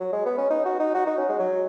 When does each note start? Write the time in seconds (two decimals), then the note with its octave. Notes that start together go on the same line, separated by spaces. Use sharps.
0.00 F#3
0.13 G#3
0.25 B3
0.38 C#4
0.50 D#4
0.65 F#4
0.80 D#4
0.94 F#4
1.07 D#4
1.18 C#4
1.29 G#3
1.40 F#3